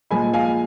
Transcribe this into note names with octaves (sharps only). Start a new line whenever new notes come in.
A#2 F3 G#3 G#5 B5
F5 G#5